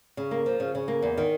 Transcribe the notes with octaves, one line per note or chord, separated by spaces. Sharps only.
C#3
A#3
F3
C#3
C#3
A#3
E2
D#3